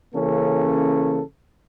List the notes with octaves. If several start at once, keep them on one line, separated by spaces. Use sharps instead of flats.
C#3 E3 A#3 C#4 A4